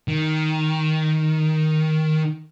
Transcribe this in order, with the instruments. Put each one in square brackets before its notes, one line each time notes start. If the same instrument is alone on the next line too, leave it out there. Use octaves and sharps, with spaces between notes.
[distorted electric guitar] D#3